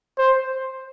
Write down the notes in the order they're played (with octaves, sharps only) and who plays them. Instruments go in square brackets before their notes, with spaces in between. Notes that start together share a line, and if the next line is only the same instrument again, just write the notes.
[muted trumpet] C5